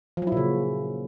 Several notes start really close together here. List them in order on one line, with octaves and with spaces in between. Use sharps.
F3 F#3 E4 A#2 C#3